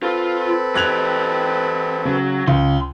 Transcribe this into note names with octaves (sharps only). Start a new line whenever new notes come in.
C4 F4 A4 B4
E3 G4 F#6 G#6 F7
C#3 F#3
C#2 C6